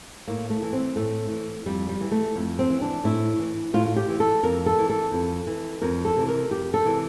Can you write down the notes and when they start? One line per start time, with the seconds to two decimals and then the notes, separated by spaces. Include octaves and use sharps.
0.28 A2 A#3
0.50 A3
0.62 E3
0.73 C4
0.96 A2 A3
1.31 E3
1.66 F2 G3
1.89 G3
2.01 E3
2.11 A3
2.36 F2
2.59 C4
2.70 E3
2.81 D4
3.04 A2 E4
3.39 E3
3.74 A2 F4
3.86 F4
3.96 G4
4.09 E3
4.20 A4
4.43 F2 A#4
4.66 A4
4.78 E3
4.90 A4
5.12 F2
5.47 E3
5.81 F2 A#4
6.05 A4
6.16 C3 E3
6.28 A#4
6.51 F2 G4
6.74 A4
6.85 C3 E3